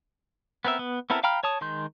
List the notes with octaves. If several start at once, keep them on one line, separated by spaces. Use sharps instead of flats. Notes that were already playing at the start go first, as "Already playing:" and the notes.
B3 C4 A#4 E5
B3
B3 C4 E4 A4 A#4
F5 G5 A#5 B5 F6
C#5 A5 D#6
D#3 G#3 C6 G6